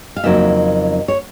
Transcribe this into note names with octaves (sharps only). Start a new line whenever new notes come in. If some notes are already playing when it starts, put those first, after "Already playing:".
F5
F2 C#3 F#3 A#3 D#4 E5
C#5